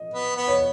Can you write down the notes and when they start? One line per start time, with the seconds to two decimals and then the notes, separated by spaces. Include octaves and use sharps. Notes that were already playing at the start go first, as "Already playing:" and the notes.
Already playing: D#5
0.14 B3
0.36 B3
0.48 C#5